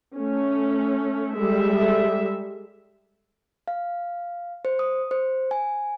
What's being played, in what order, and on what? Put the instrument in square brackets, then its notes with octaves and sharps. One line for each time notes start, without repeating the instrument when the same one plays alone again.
[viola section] A3 C#4
G3 G#3 A4 E5
[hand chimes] F5
C5
D#6
C5
G#5